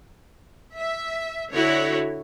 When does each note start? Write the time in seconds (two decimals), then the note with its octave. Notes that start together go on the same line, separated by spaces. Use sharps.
0.76 E5
1.53 D3 E4 F#4 C#5